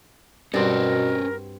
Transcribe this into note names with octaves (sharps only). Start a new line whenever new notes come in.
G2 B2 C4 C#4 F#4 A#4 C5